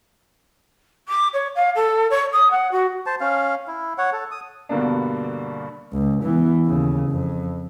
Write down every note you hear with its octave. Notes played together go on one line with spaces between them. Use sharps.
D6
C#5
F5
A4
C#5
D#6
F#5
F#4
C5 A5
C#4 F5
E4
C#5 F#5
A4
D#6
G2 B2 D3 A#3 B3 D4
C#2
E3 B3
D#2 C#3
F2